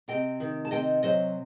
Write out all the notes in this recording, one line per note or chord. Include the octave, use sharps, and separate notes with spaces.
C3 D#5 G5
D#3
A5
C3 D#5 G5
F#3 C5 D#5